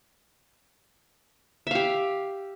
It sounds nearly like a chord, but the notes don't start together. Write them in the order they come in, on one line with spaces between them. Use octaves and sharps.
E5 F5 G4